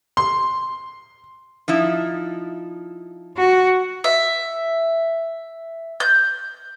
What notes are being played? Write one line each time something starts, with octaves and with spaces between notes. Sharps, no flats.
C6
F3 D#4 E4
F#4
E5
G6